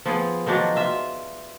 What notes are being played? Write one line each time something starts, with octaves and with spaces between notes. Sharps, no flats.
F3 B3 G#4
D#3 F3 F#3 D4
F4 E5